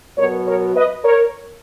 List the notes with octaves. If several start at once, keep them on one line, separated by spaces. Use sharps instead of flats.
B2 F#3 B3 A#4 C#5
A#4 C#5
B4 D#5
A#4 C#5